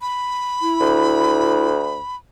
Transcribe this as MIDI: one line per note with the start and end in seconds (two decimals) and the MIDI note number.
0.01 2.16 83
0.61 1.65 64
0.80 2.02 38